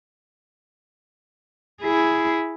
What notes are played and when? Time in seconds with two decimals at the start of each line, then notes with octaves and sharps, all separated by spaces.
1.82 E4 G#4